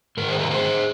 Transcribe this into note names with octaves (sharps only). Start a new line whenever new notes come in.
G#2 D#3 A#4
G#4 C5
G4 A#4
G#4 C5